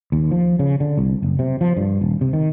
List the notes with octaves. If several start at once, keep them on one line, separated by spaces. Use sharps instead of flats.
D#2
F3
C#3
D3
C2
F#1
C3
F3
G2
D#1
C3
D#3